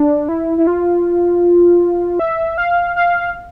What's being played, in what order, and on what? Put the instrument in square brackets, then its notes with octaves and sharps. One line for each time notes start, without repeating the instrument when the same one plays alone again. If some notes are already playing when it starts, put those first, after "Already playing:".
Already playing: [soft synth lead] D4
E4
E4
F4
E5
F5
F5